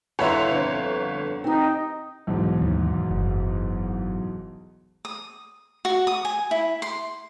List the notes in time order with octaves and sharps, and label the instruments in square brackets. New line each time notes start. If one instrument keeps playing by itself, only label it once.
[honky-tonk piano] G1 C#5 E5 [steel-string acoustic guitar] D3 E4 [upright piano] F#5 A#5 C6
[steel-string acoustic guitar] F2 D3
[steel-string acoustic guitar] C4 G4 [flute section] D#4
[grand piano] B1 E2 G#2
[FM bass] D#2
F#1
[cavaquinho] D#6
F#4
D#6
G#5
E4
C6